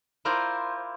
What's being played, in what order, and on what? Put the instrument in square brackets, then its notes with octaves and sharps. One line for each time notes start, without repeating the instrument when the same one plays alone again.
[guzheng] E4 F4 A#4 C5 D5